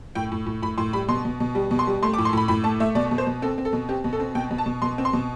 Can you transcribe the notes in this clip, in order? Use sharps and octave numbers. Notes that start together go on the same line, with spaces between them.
A2 G5
A2
A2
A2 B5
A2 C6
G3 B5
B2 C6
B2
B2
G3
B2
C6
G3
A3 C6
D6
A2
C6
A2 B5
A2 B5
A3 A5
A3 E5
B2 D5
B2
C5
B2
C4 A4
C4
A4
B2
C4 G4
B2
A4
C4
B2 G5
B2
A5
B2
B2 C6
C4
C6
B2